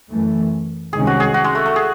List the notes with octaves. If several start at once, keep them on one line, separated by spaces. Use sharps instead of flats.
F#2 E3 A3
C2 C3 D#3 G#3 C#4 G#4
F#4
G#4
F#4
G#3
A3
A3
G#4